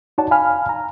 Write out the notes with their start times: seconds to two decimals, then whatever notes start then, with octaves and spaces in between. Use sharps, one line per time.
0.18 D#4 F#4 C#5 D5 F#5 A5
0.31 F5 G#5 B5 F6
0.69 A#5